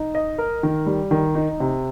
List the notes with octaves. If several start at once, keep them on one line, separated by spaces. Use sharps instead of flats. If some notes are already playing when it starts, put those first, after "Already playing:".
Already playing: D#4
D#5
A#4
D#3
G3
D#3
D#4
C3